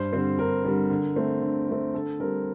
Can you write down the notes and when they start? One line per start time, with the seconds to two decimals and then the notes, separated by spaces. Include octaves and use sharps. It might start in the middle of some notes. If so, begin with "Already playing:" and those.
Already playing: G2 C5
0.13 D3 G3 C4
0.39 G2 A#4
0.65 D3 G3 C4
0.90 D3
1.16 A3 C4
1.42 D3
1.68 A3 C4
1.94 D3 A4
2.20 G3 C4 A#4